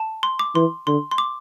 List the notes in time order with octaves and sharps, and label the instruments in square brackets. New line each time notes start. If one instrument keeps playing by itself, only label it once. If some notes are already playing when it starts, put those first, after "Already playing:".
Already playing: [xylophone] A5
C6
D6
[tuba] E3 [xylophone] C6
[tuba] D3 [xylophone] C6
[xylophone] C6
D6